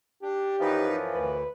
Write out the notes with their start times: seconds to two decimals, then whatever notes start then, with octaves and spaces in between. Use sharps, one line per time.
0.23 D4 G4
0.60 F#2 E3 F3 D#4 B4
1.14 D2 B4